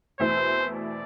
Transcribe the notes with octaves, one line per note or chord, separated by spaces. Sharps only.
E2 B2 A3 C4 E4 C5
D5